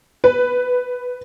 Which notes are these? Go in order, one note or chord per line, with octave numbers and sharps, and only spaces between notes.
B4